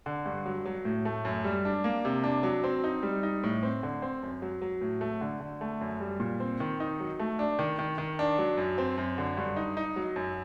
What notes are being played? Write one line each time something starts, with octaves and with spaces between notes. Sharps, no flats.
D3
G2
F#3
F#3
A2
A3
F#2
G3
D4
A#3
C3
D4
F#3
C4
D#4
G3
D#4
A2
C4
D3
C4
F#2
F#3
F#3
A2
A3
D3
D3
A3
F#2
G3
A#2
C4
D#3
D#4
F#3
A3
D4
D#3
D#3
D#3
D4
F#3
F#2
C4
F#2
D3
G2
D#4
D#4
F#3
F#2